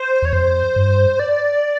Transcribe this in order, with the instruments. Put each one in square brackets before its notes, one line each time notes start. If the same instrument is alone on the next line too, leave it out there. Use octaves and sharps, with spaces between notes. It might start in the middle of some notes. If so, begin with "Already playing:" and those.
Already playing: [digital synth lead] C5
[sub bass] E2 [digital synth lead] C#5
[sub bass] F2 [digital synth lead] C5
[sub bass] G2
[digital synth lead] D5